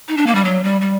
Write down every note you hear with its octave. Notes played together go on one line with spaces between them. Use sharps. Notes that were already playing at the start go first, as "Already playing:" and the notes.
D#4
D4
A#3
G3
F#3
G3
G3